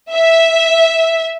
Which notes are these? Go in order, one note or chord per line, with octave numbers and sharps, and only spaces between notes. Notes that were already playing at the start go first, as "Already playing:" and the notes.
E5